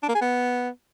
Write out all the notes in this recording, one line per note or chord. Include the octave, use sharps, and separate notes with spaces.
D4
A#3
G#4
B3